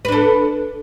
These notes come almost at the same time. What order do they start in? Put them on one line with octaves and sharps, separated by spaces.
B4 D4 A4